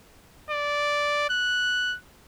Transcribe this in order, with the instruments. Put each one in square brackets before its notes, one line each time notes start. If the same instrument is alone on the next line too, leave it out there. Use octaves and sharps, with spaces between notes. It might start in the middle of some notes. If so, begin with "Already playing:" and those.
[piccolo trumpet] D5
F#6